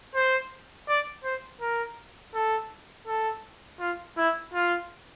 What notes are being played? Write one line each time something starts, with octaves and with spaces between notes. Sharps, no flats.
C5
D5
C5
A#4
A4
A4
F4
E4
F4